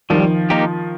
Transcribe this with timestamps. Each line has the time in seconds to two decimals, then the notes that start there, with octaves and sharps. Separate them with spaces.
0.10 D#3 F3 G3
0.50 A#3 D#4 G4 A#4